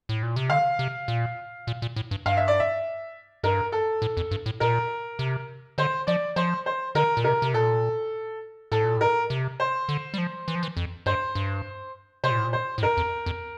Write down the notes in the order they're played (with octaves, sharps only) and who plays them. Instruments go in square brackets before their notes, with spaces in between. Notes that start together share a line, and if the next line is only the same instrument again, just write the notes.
[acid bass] A2
A#2
C3
[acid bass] D3 [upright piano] F5
[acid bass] C3
A#2
A#2
A#2
A2
G2
[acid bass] G2 [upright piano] F5
[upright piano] E5
D5
E5
[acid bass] G2 [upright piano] A#4
[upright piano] A4
[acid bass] A2
F2
G2
A2
[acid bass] A#2 [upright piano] A#4
[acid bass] C3
[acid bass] D3 [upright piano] C5
[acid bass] F3 [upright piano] D5
[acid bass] F3 [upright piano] C5
[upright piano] C5
[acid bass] D3 [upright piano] A#4
[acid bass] A#2
[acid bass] C3 [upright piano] A#4
[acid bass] C3
[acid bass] A#2 [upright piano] A4
[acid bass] A2 [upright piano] A4
[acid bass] A#2
[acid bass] A2 [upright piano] A#4
[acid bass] C3
[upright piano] C5
[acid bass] D3
G3
F3
E3
F3
E3
F2
[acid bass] G2 [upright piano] C5
[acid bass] G2
[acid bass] C3 [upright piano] C5
[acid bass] A#2
A2
A#2
[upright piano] C5
[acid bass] A2
[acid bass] G2 [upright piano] A#4
[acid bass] F2
F2